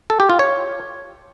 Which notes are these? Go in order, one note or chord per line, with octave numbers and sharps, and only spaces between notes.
A4
G4
F4
C#5